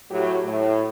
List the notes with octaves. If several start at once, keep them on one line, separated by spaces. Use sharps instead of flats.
A2 F#3 G4
A2